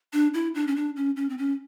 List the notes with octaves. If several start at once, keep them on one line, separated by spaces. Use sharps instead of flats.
D4
E4
D4
C#4
D4
C#4
C#4
C4
C#4